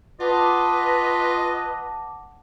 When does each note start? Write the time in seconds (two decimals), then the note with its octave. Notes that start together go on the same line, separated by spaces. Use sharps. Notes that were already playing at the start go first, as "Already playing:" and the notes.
0.20 F4 B4 D#5 F#5 A5 D6